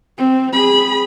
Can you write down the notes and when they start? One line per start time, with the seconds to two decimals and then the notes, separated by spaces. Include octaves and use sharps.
0.18 C4
0.53 G#4 B5